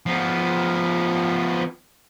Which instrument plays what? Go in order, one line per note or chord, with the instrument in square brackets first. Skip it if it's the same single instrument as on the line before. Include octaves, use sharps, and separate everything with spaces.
[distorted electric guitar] F3 B3